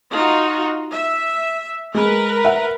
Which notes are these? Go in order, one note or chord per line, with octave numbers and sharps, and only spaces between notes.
D#4 F4 F#4
E5
G#3 A#4 B4
E5 F#5